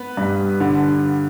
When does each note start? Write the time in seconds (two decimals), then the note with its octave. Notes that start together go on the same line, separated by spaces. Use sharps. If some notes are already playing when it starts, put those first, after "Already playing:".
Already playing: B3 B4
0.17 G2
0.60 D3